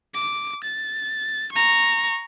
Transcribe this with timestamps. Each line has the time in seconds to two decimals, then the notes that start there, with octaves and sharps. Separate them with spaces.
0.14 D6
0.63 A6
1.52 A#5 C#6